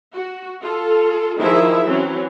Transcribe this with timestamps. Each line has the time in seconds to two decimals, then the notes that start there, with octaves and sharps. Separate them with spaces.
0.15 F#4
0.62 F4 A4
1.38 D#3 F3 E4 G#4 E5
1.85 E3 F#3 C4 C#4